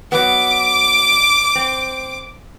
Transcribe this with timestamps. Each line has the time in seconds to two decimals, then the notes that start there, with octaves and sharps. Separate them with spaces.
0.12 F#3 B3 D6
1.55 C4